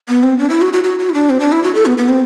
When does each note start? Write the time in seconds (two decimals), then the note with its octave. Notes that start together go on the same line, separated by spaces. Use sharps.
0.09 B3
0.23 C4
0.38 D4
0.50 E4
0.62 F#4
0.73 F#4
0.84 F#4
0.99 F#4
1.09 E4
1.14 D4
1.30 C4
1.40 D4
1.52 E4
1.64 F#4
1.75 A4
1.86 B3
1.98 B3
2.09 C4